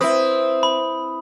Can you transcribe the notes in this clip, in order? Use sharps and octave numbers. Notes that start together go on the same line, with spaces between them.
C4 E4 B4 D#6
B5